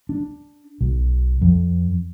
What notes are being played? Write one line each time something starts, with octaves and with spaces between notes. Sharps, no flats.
D4
B1
F2